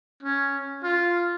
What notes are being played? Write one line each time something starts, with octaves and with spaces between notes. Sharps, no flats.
C#4
F4